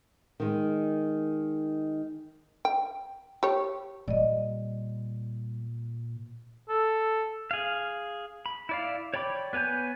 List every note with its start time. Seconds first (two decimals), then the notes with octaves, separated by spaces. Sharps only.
0.40 D#3 G#3
2.65 G5
3.43 G4 C#5
4.08 A#2 G3 D5 D#5
6.69 A4
7.51 G#4 F5
8.46 B5
8.69 E4 D5 F5
9.14 C#5 D5 G5 B5 D6
9.53 B3 B4 C#5 G#5 G6